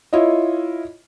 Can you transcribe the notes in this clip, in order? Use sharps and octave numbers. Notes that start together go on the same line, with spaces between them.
E4 F4 C#5 D#5